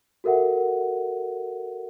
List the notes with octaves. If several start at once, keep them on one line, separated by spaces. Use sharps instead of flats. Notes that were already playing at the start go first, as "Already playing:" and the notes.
F#4 A4 A#4 E5 F#5